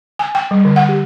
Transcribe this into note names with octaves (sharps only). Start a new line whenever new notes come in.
G#5
G5
G3
D3
F#5
G4